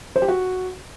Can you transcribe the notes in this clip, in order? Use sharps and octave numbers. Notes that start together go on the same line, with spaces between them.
C5
G4
F#4